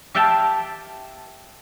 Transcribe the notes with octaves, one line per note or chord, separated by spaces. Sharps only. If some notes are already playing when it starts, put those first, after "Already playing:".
G4 E5 F5 G5 A5